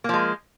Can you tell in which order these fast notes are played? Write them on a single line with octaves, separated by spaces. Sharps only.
A#3 F3 G#3